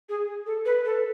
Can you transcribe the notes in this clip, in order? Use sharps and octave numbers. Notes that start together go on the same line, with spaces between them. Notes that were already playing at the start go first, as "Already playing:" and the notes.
G#4
A4
B4
A4